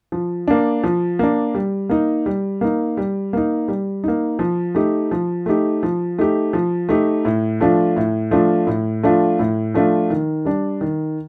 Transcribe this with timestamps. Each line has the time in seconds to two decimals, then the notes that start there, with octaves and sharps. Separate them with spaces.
0.12 F3
0.48 A#3 D4
0.84 F3
1.19 A#3 D4
1.54 G3
1.89 A#3 D#4
2.26 G3
2.61 A#3 D#4
2.97 G3
3.33 A#3 D#4
3.68 G3
4.04 A#3 D#4
4.39 F3
4.75 A3 D#4 G4
5.11 F3
5.46 A3 D#4 G4
5.83 F3
6.18 A3 D#4 G4
6.53 F3
6.89 A3 D#4 G4
7.25 A2
7.61 F3 A3 D4 F4
7.97 A2
8.31 F3 A3 D4 F4
8.67 A2
9.03 F3 A3 D4 F4
9.39 A2
9.74 F3 A3 D4 F4
10.10 D#3
10.45 G3 D4
10.81 D#3